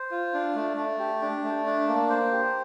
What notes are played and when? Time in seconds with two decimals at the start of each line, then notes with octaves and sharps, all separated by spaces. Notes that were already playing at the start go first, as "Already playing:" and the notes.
Already playing: C5
0.11 F4
0.34 D4
0.55 A3
0.77 A3
0.99 G4
1.22 D4
1.44 A3
1.66 D4
1.88 A#3
2.09 C5
2.32 G4